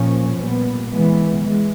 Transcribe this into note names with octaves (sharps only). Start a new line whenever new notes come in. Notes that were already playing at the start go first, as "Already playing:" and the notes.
Already playing: A#2 F3 A#3 C#4
A#2 G3 B3
E3 G#3 B3
E3 G#3